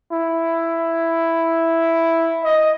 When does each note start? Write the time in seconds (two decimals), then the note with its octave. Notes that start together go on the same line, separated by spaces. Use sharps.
0.12 E4
2.44 D#5